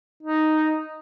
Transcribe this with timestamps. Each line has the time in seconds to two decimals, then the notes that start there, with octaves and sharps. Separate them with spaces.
0.23 D#4